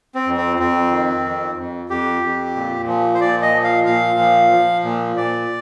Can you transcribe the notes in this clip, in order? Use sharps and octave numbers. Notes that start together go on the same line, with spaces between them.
C4
F2
C4
F2 C4
D#3
F2
F2
F2 G4
F2
A#2
F3
C5
A#2 D5
D#5
F3
F5
A#2 F5
F3
F3
A#2
A#2 D5